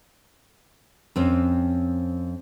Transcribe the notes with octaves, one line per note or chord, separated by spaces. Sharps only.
F2 C4 C#4